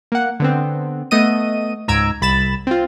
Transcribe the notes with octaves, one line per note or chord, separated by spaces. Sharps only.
A#3 F#5
D3 B3 C4
A3 B3 D#5 D#7
C#2 G#2 A#5 E6 G#6 D7
C2 B5 A6 E7
C4 F4